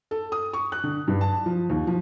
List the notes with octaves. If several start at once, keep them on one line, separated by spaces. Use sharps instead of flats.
A4
D#6
C#6
F#6
D3
G2
A5
F3
D#2
F3